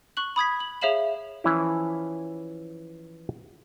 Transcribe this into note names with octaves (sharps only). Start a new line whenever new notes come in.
C#6 F#6 F#7
B5 D#6 G#6 B6
F#7
G#4 C#5 E5 F5 E7 F#7
E3 F3 C#4 E4